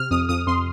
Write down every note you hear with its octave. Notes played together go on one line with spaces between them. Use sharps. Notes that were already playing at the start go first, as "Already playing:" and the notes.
Already playing: C3 F6
F2 D#6
F2 D#6
F2 C6